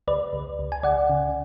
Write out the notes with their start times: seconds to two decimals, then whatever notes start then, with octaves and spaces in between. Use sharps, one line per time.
0.08 C#2 B4 D5
0.33 C#2
0.59 C#2
0.72 G#5
0.83 C#2 D5 F#5
1.10 C#3